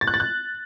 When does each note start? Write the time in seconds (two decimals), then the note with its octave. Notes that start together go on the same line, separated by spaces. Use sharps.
0.01 A6
0.07 F#6
0.14 A6
0.20 F#6